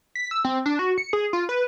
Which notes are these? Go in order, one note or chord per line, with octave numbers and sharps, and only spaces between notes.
B6
E6
C4
D4
F#4
C#7
G#4
F4
B4